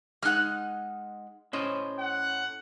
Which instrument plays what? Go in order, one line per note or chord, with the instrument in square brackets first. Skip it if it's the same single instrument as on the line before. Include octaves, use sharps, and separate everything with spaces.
[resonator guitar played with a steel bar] G#3 D#4 F#5 [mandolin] F6 F#6
[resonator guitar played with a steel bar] A2 [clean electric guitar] C#4 C5 D#5
[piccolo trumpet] F#5